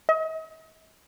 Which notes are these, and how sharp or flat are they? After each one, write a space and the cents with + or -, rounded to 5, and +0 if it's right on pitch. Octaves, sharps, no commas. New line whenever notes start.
D#5 +45